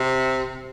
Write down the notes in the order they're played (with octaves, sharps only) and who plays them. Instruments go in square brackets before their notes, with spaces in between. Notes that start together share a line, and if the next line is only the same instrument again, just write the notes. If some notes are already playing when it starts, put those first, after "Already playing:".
Already playing: [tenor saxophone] C3